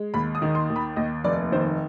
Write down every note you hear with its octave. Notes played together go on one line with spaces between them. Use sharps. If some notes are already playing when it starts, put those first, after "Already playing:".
Already playing: G#3
D#2 B5
D#6
D#3
C6
D#2
B5
D#2 D#5
F1 D5
D#3 C5